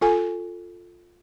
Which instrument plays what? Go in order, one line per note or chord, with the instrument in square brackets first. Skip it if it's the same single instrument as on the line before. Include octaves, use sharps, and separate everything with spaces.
[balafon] F4 A4 G#5